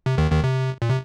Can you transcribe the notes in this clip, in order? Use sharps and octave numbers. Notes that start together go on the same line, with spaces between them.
C3
D#2 D#3
D#2 D#3
C3
A#2
C3